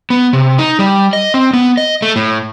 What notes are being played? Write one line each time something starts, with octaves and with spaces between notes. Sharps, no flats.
B3
C3
D#4
G3
D#5
C4
B3
D#5
A3
A2